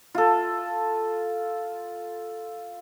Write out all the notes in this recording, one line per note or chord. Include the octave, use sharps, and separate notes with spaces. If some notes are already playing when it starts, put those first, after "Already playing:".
F4 A4